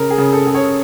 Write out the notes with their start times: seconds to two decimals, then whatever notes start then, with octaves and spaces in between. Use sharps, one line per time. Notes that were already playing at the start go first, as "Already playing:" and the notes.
Already playing: C#3 A#4
0.10 G#4
0.18 C#3
0.33 A4
0.47 C#3
0.54 C#5